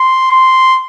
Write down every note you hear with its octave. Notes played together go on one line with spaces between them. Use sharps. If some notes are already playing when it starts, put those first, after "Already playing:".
Already playing: C6
C6